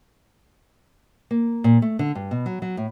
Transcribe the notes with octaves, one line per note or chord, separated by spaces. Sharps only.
A#3
A#2
A3
D3
G2
B2
F#3
F#3
A2